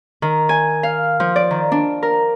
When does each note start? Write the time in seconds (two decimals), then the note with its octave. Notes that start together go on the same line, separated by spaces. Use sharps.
0.22 D#3
0.49 G#5
0.83 F5
1.20 F3
1.36 D5
1.51 D#3
1.72 D4
2.03 A#4